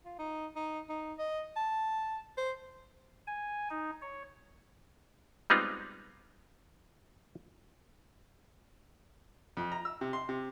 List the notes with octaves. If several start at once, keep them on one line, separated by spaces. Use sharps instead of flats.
F4
D#4
D#4
D#4
D#5
A5
C5
G#5
D#4
C#5
G3 G#3 B3 C4 D#4 F4
F2
A#5
E6
C3
C6
C3